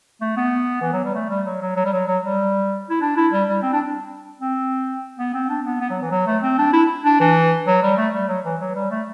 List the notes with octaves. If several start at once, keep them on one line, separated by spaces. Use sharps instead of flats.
A3
B3
E3
F#3
G3
A3
G3
F#3
F#3
F#3
G3
F#3
F#3
G3
E4
D4
E4
G3
G3
C4
D4
C4
B3
C4
D4
B3
B3
F#3
E3
F#3
A3
C4
D4
E4
D4
E3
F#3
G3
A3
G3
F#3
E3
F#3
G3
A3